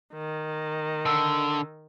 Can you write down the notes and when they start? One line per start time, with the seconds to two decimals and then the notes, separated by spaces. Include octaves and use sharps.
0.13 D#3
1.06 D3 E6